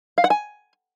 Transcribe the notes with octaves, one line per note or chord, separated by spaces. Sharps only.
F5
F#5
G#5